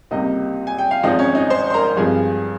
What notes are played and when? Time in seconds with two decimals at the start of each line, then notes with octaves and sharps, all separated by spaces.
0.11 C#2 C3 G3 A#3 D#4 D#5
0.67 G#5
0.79 G5
0.91 F5
1.03 G#1 G#2 F3 C4 D#4 D#5
1.19 C#4 C#5
1.35 D#4 D#5
1.50 C5 C6
1.70 C6
1.74 A#4 A#5
1.96 G2 F3 G#3 C4 G#4 G#5